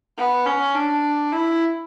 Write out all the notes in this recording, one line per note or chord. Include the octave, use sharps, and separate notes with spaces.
B3
C#4
D4
E4